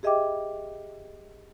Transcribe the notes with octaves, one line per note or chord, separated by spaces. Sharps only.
G4 G#4 D#5 E5 G5 D6